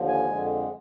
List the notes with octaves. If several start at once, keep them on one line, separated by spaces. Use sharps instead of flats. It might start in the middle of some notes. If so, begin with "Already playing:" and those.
Already playing: D#2 D3 F3
G#5
F2 D3 G#3